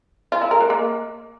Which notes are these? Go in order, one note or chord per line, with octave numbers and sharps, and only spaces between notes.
F4
E4
A#4
G#3
A#3